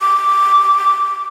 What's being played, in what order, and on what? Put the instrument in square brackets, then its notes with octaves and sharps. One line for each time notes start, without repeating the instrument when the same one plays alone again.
[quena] D6